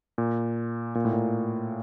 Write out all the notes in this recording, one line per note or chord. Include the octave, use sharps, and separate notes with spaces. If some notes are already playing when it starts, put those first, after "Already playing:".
A#2
A#2
A2
A#2